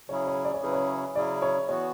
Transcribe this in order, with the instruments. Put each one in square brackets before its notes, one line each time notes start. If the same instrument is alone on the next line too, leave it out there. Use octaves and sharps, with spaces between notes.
[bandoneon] C#3 F#3 C#4 E4 G#4 [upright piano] C#5
[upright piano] C#5
D5
C#5
[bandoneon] C#3 F#3 C#4 E4 G#4 [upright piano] B4
[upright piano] C#5
[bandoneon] C#3 F#3 C#4 E4 G#4 [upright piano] D5
[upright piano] C#5
[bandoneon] E3 B3 F#4 [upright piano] C#5